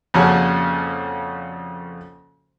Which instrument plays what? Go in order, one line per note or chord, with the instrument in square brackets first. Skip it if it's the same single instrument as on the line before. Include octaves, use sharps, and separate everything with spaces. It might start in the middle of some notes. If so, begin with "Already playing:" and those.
[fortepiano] F2 A#2 C#3 C#4 F#4 A5